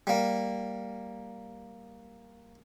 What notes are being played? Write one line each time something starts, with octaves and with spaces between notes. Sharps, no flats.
G3 A#3